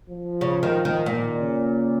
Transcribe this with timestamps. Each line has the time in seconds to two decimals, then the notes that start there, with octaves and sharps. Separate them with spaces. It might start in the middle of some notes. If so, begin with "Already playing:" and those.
0.09 F3
0.41 C#3
0.63 D#3
0.85 D#3
1.06 A#2 D#3
1.39 C#3